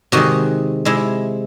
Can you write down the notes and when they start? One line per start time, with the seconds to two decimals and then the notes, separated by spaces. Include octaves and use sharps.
0.12 C3 D#3 G#3 F#4
0.85 C3 G#3 E4